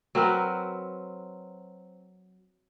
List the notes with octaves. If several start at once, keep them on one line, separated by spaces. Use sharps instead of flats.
F#3 C4 A#4 B4